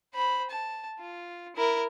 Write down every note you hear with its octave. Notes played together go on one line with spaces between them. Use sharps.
C5 B5
A5
F4
E4 A#4